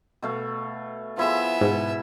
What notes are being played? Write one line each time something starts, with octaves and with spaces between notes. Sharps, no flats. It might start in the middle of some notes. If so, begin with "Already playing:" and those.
B2 A3 F5
F3 B3 E4 G#4 E5
G#2 B2